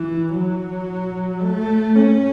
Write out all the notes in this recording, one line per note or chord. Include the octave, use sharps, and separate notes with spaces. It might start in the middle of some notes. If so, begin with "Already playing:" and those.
Already playing: E3
F#3
A3
C#4